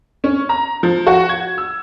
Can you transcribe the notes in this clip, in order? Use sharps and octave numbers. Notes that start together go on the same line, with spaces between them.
C#4
A#5
F3
F#4
G#6
E6